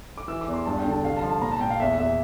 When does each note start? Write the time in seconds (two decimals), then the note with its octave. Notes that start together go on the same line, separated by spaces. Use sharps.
0.18 D6
0.28 E3 E6
0.41 D6
0.48 E2
0.54 C6
0.66 G2 A5
0.79 G5
0.85 D3
0.91 A5
1.04 C2 F5
1.16 A5
1.22 F3
1.30 A5
1.41 A#2 A#5
1.52 A5
1.60 A#2 G5
1.70 F5
1.80 E2 E5
1.98 E2 E5